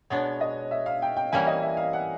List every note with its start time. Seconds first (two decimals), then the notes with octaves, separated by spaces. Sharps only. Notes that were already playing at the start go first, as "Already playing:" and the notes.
0.10 B2 G#3 B3 D4 C#5
0.41 D#5
0.71 E5
0.86 F5
1.02 G5
1.17 G5
1.32 E3 G3 A#3 C#4 E4 G#5
1.47 D#5
1.62 E5
1.77 F5
1.93 F#5